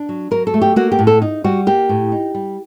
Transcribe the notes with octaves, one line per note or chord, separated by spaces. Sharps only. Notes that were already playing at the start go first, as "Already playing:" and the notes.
Already playing: D4
F#3
F#3 A#4
A4
A3
G4
A#3 F#4
G4
A2
A4
D#4
G3 F#4
A#3 G4
A2
D#4
G3